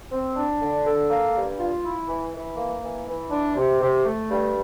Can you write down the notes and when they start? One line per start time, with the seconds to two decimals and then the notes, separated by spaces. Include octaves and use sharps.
0.11 C4
0.36 D4
0.60 D3
0.85 A4
1.10 A#3
1.35 G2
1.58 F4
1.83 E4
2.08 E3
2.33 E3
2.57 A#3
2.82 E3
3.07 E3
3.31 D4
3.56 C3
3.81 C3
4.05 A3
4.30 G2